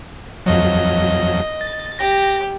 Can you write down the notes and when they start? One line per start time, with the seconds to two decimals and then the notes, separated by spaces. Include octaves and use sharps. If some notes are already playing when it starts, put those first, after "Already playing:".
0.46 F2 F3 F#3 D#5
1.61 A6
1.99 G4 A#6